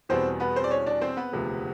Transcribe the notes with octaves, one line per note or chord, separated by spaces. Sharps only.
E2 B2 G3 B3 C4 C5
B3 B4
C4 C5
D5
C#4 C#5
D4 D5
C4 C5
B3 B4
E1 D2 C3 F3